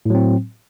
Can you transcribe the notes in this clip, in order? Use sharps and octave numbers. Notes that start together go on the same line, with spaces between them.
A2 F#3 C4